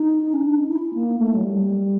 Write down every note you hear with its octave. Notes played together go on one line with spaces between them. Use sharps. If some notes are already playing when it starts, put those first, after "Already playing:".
Already playing: D#4
C#4
D4
D#4
E4
E4
A#3
A3
F#3
G3